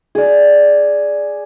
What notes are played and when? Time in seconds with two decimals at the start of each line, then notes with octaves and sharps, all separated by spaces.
0.15 G#4 D5